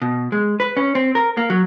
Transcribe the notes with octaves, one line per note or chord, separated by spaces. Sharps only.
B2
G#3
B4
C#4
C4
A#4
A#3
F#3